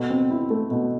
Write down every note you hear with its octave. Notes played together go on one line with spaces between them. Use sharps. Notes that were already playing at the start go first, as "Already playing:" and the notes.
Already playing: B2 A3
C4
E4
A3
B2